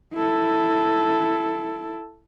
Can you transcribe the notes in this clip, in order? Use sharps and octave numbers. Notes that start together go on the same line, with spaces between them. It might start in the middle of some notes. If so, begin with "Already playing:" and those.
E4 A4